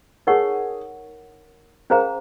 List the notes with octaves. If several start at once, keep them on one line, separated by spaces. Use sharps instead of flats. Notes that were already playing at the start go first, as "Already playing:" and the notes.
D#4 G#4 A#4 C#5 F#5 C#6
C#4 G#4 A#4 C5 F5 A#5